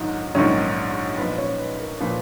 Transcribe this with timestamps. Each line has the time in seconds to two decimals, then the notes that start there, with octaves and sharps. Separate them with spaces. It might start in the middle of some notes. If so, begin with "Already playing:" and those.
Already playing: A#1 G#2 D#3 F#3
0.35 A#1 G#2 D#3 F#3 C#4 C#5
1.17 B1 A#2 F3 B4
1.38 C#4 C#5
1.59 B4
1.80 A#4
2.00 A#2 F3 B4